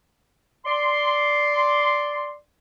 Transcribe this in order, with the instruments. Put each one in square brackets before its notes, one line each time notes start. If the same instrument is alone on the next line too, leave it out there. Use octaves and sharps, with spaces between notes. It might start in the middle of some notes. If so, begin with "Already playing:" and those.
[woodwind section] D5 C6